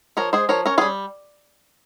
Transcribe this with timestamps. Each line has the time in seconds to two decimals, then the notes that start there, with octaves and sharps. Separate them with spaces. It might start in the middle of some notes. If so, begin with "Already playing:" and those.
0.17 F3 A#4 C#5
0.33 G#3 G#4 C5
0.49 F3 A#4 C#5
0.66 C#4 A#4 C#5
0.78 F4 G#4
0.81 G3